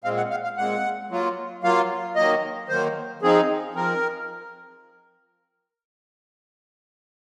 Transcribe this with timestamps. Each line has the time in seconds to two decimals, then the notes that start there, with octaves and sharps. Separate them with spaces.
0.04 A#2 G#3 C4 F5
0.17 F#5
0.31 F5
0.44 F5
0.57 A#2 G#3 C4 F#5
1.10 F#3 A#3 F4
1.63 F#3 A#3 F4 F5
2.16 D#3 F#3 A#3 D#5
2.69 D#3 F#3 A#3 C5
3.22 F3 C4 D#4 G#4
3.75 F3 C4 A#4